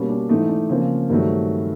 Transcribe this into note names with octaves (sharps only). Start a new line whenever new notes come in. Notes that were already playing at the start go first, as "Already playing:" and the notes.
Already playing: B2 G3 A#3 C#4
D4
G#2 E3 A3 D#4
D4
C#3 F3 A#3 C4
G2 D#3 F#3 A3